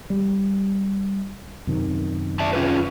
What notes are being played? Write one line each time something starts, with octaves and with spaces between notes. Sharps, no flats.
G3
F#2 C3 D#3
D5 E5 A5
C#4 F4 B4